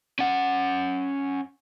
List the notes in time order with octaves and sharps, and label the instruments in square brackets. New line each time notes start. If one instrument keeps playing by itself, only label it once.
[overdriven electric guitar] C#4 F#5